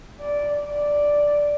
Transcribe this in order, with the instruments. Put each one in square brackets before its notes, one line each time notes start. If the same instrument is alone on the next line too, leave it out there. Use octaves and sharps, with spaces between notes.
[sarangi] D5
D5